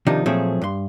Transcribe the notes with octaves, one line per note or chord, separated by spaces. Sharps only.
C3 D#3 F3 D4 D#4
A#2 F3 F#3 A3 C4 G#4
G2 C6